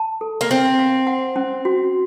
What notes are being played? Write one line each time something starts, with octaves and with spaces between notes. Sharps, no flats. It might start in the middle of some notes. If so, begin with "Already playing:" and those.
Already playing: A5
A4
A#3
C4 C5
F5
F#5
C#4
F#4